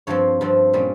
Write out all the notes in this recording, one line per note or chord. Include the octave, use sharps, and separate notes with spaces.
G2 F3 C4 C#5
G2 F3 C4
A#2 G3 C#4